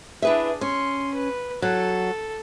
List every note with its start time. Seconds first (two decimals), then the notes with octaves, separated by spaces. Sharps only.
0.22 D4 E4 G#4 B4 E5
0.61 C#4 C6
1.14 B4
1.62 F#3 A4